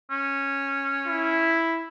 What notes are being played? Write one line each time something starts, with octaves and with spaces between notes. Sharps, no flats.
C#4
E4